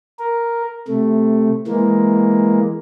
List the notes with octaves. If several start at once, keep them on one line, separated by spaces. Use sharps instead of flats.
A#4
C3 A3
E3 G#3 A#3